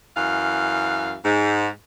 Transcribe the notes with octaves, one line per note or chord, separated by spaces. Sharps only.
F#2 E3 F5
G#2